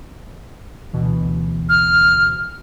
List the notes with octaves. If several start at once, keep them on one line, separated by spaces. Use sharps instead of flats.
D2 B2 E3
F6